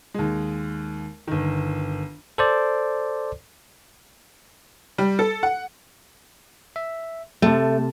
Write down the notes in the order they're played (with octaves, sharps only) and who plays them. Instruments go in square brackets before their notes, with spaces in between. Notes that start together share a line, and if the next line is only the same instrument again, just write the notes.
[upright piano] D#2 G#3
G1 D#3
[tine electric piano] A4 C5 D5
[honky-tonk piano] G3
A4
F#5
[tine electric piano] E5
[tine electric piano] C3 A5 [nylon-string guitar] A3